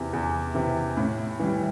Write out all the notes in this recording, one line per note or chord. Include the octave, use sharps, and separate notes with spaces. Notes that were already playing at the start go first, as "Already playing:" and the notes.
Already playing: E2 C3 E3
E2
C3 E3
A2
E3 G3